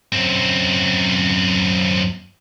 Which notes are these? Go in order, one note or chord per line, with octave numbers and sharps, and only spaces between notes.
F#2 C4